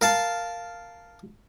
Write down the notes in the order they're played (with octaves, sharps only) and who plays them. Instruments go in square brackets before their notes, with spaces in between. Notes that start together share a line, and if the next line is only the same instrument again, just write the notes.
[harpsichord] A#4 F5 A5